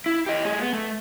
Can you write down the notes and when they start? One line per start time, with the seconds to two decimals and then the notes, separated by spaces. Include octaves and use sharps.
0.06 E4
0.26 G4 D#5
0.45 A3 G#4
0.61 B3
0.73 A3